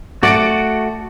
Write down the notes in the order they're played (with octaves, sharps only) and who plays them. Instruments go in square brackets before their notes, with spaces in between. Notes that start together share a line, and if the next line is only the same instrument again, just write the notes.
[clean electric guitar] A3 F#4 [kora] D5 [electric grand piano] F#5 A6 D7